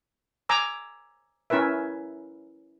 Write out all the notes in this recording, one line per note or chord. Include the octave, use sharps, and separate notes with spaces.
G#5 A#5 D6 E6
C#4 E4 A#4 B4 E5